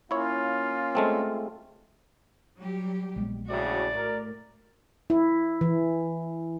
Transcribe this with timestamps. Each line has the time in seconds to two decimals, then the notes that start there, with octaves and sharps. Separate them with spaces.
0.11 A#3 C#4 E4 F4 C#5
0.95 G#3 A3 C4
2.57 F#3 G3 G4
3.16 A#1 G#3 B3
3.50 D2 A2 C#3 F#4 D5
3.95 A2 A#4
5.10 E4
5.61 E3